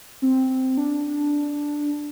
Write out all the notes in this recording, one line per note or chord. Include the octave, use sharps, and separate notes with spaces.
C4
D4